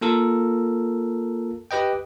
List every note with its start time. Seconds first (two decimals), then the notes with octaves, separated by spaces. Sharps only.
0.01 A#3 F4 A4 A#4
1.71 G4 B4 D#5 G5